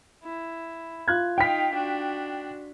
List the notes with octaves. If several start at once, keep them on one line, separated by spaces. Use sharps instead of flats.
E4
F4 F#6 G#6
D#4 F5 G5 B6
D4 F#4